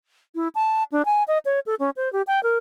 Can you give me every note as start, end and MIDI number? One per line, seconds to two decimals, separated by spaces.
0.35 0.48 64
0.55 0.83 81
0.92 1.05 62
1.05 1.23 80
1.28 1.38 75
1.45 1.60 73
1.66 1.75 69
1.80 1.90 61
1.96 2.11 72
2.13 2.22 67
2.27 2.42 79
2.43 2.58 70